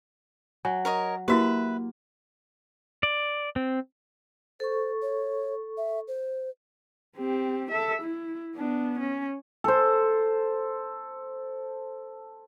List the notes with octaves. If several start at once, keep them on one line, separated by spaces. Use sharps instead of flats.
F#3 G#5
A#4 C#5 D#5
A#3 E4 F#4 G4 B4 E5
D5
C4
A4 C5 C#6
C#5
E5
C5
C4 G4
A4 E5
E4
B3 D4
C#4
A4 C5